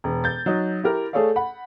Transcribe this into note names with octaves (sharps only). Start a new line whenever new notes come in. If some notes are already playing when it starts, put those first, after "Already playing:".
E1
G6 A6
F#3 D#4
E4 G4 A#4
A3 G#4 A4 C#5 D5 F5
F#5 B5